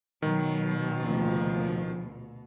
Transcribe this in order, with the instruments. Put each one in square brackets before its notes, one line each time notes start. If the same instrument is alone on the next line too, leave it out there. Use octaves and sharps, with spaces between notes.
[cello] B2 [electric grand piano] D#3 [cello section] F#3
[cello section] D2 A#2 C#3 [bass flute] F3